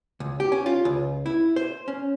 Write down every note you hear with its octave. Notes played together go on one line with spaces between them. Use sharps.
C#2
G4
C#4
F4
C#2
E4
C5
C#4